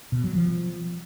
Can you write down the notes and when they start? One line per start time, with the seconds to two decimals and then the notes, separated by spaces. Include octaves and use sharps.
0.12 B2
0.24 F#3
0.35 F3